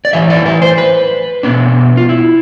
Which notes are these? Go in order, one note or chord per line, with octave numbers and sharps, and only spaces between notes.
D5
A2 E3 A3 E5
D5
B4
C5
B4
B2 B3 D4
F4
E4